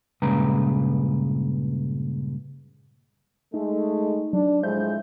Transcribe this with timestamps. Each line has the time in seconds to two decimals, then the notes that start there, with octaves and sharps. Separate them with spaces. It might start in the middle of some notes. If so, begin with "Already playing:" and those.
0.22 G2 A#2 C#3 G#3 B4 A#5
3.54 G#3 A3 D#4
4.33 F#3 D4
4.63 A2 F3 G#3 C5 E5 G6